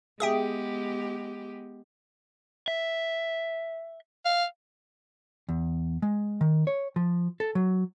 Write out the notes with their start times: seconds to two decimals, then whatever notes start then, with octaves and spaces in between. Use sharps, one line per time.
0.20 G#3 B3 G4 G#4 E5 G5
2.68 E5
4.25 F5
5.49 E2
6.02 G#3
6.41 D#3
6.67 C#5
6.96 F3
7.40 A4
7.55 F#3